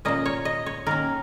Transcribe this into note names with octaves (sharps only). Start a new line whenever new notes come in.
A#2 A#3 C#4 D#5
C#5
D#5
C#5
D#3 A#3 C#4 A#4